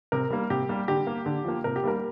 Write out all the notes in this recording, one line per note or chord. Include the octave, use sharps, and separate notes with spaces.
C3 A#4
G3 A#3
C3 G4
G3 A#3
D3 G4
A#3
D3
F3 A#3
C3 A#4
G4
G3 A#3 A#4